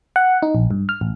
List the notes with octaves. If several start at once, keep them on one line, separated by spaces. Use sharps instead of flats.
F#5
D#4
A#1
G2
F6
A1